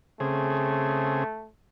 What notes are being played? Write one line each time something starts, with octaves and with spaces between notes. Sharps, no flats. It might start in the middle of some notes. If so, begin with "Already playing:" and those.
C#3 A3 C4 G#4